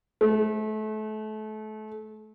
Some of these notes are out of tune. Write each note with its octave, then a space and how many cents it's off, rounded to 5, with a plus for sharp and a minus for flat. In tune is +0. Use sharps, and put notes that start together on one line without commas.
A3 -30